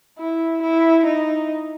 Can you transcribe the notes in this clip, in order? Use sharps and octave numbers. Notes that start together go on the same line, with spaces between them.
E4
E4
D#4